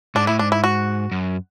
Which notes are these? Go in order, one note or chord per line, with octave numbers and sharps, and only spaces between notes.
G#2 D4
A2 E4
G#2 D4
E4
F#4
F#2